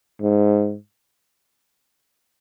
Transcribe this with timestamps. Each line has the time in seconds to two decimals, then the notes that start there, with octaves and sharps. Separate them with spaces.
0.22 G#2